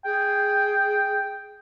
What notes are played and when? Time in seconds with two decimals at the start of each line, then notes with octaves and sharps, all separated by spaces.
0.05 G#4 G5